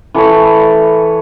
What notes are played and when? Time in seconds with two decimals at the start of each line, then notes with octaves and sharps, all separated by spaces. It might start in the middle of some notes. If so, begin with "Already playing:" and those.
0.14 E3 A4 B4 C#5